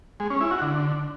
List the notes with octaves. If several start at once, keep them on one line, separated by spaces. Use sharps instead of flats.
G#3
C#4
E4
F#4
D3